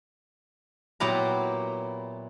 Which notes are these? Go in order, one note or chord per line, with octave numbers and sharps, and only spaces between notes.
A#2 F#3 B3 E4 G4 A#5